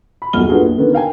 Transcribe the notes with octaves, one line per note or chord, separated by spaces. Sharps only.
B5
D#1 B1 F#2 F#4 F6 G7
B3 D4 F4 F#4 G#4 A4
A#1
D3 D#3 A#3 B3 C#4
A#4 F5 G5 G#5